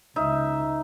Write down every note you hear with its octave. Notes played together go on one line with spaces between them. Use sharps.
C#2 C#3 D#4 E5